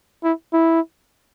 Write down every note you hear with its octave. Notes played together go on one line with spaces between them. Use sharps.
E4
E4